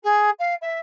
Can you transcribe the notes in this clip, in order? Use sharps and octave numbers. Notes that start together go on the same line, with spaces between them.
G#4
F5
E5